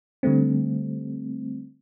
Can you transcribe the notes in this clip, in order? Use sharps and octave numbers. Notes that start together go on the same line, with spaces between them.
D3 G3 A3 C4